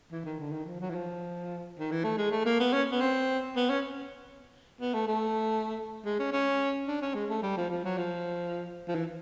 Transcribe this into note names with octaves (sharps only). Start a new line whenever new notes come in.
E3
D#3
D3
D#3
F3
F#3
E3
F3
D#3
E3
A3
G#3
A3
A#3
B3
C#4
B3
C4
B3
C#4
B3
A3
A3
G#3
C#4
C#4
D4
C#4
G#3
A3
G3
F3
F3
F#3
F3
F3
E3